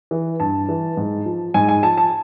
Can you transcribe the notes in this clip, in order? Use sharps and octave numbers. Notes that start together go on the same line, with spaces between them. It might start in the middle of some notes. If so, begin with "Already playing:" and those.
E3
G2 A5
E3
G#2
F3
G#2 G#5
G#5
F3 A5
A5